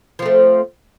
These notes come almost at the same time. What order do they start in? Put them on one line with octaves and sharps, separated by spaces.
F3 C4 A3